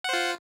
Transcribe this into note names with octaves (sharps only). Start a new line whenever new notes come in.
F4 C5 F#5